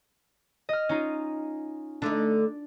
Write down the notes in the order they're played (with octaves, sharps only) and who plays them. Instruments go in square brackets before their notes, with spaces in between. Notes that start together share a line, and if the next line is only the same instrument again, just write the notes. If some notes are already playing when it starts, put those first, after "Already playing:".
[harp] D#5 F6
C#4 D#4 F4
[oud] D3 A3 D#4 [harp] D4